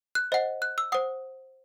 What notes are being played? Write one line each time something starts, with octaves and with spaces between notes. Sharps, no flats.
F#6
C5 D#5 F#5
F#6
E6
C5 F#5 D#6